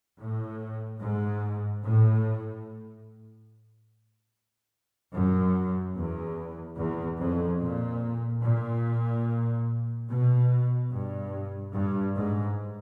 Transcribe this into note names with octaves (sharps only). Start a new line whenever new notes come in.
A2
G#2
A2
F#2
E2
E2
F2
A#2
A#2
B2
G2
G2
G#2